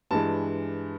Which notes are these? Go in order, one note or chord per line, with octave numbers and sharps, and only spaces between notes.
G2 E3 G#3 A5